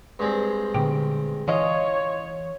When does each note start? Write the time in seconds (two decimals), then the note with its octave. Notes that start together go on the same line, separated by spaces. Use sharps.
0.19 G2 G#3 C4
0.74 A#2 D3 B3 G4
1.48 E3 C#4 F4 C#5 D#5